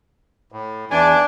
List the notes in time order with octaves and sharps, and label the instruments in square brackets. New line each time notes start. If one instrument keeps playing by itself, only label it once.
[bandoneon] A2
[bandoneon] E2 E3 G#5 [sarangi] D4